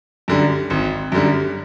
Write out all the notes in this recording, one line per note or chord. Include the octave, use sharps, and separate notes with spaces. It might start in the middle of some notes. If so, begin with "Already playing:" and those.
F#2 D3 G3
G#1
F#2 D3 G3